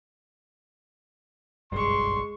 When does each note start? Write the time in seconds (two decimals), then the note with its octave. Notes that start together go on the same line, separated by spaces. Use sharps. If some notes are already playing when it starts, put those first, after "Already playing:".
1.72 F#1 B1 G2 G#3 C6 C#6